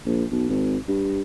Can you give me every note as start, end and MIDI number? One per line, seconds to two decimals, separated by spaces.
0.06 0.24 34
0.32 0.45 35
0.49 0.77 32
0.88 1.22 43